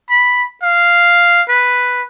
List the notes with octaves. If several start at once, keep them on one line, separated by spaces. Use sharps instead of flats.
B5
F5
B4